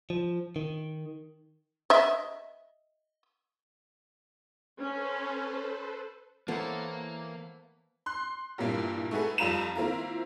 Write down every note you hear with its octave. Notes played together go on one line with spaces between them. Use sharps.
F3
D#3
D#5 E5
C#4 A4 B4 C5
E3 A#3 B3 A4 A#4 C5 C#5
C6 F#6
G2 A#2 E3 G3 A#3 E4
A3 D#4 F#4 G#4 A4 B4
F2 G3 F4 A#5 B5 E7
D#3 A#3 C4 E4 F4 A#5